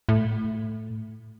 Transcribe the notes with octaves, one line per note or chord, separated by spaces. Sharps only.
A2